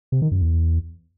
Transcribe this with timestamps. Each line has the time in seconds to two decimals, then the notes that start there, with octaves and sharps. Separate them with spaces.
0.12 C3
0.22 D#3
0.31 F#2
0.41 E2